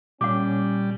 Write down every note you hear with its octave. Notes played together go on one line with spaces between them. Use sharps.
A#2 G3 C#4 F#5 D6